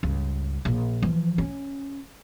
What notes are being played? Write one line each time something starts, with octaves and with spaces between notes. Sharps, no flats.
C#2 G2
A#1
E3 F3
C#4